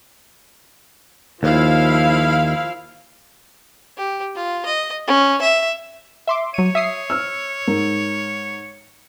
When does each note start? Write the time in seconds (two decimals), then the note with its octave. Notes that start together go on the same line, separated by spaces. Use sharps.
1.43 D#2 F3 E4 F5
3.97 G4
4.35 F4
4.65 D#5
5.07 C#4
5.41 E5
6.27 E5 C6 D6
6.54 F#3 C#5 D#7
6.75 E5 D#6 C7
7.10 E6 F6
7.68 G#2 A#4